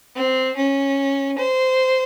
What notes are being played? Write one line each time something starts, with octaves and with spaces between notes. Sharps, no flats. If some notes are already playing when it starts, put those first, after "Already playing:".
C4
C#4
C5